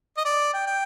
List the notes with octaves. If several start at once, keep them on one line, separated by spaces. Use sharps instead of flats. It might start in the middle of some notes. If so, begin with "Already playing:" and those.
D#5
D5
G5
G5